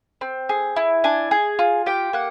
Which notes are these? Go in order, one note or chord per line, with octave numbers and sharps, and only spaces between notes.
C4
G#4
E4
D4 G#5
G#4
F4
G4 G5
A#3 F#5